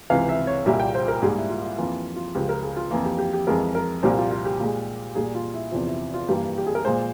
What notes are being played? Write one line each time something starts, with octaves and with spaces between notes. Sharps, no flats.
C#2 C3 E3 F5
E5
C#5
C2 A#2 G3 A#3 E5
G5
C5
A#4
G#2 G3 A#3 G#4
E4
F4
E4
F2 E3 A#3 F4
F4
C#2 C#3 F3 G4
A#4
G#4
F4
F2 E3 A#3
G4
G4
G4
F2 E3 G#3 A#4
A#4
C2 A#2 G3 A#3 C5
F4
F4
G4
A#2 G#3
A#2 G3 A#3 G#4
F4
E4
E2 C3 F3 F4
E4
F4
G2 E3 G3 A#3 G4
G4
G#4
A#4
A#2 G#3 C5